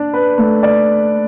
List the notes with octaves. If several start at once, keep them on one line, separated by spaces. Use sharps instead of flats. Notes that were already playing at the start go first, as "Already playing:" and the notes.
Already playing: D4 D5
B4
A3
D5